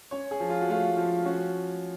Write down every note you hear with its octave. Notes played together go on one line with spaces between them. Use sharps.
C#4 C#5
G#4
F3
F4
F#4
A3 F4
F3
C#4 F#4